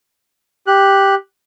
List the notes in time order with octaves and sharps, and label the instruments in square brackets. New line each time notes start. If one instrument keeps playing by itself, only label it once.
[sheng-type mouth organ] G4 F#6